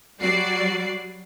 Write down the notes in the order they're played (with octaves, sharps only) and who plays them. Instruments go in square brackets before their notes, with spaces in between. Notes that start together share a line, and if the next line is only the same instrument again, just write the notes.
[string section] F#3 G3 F#4 D5 C7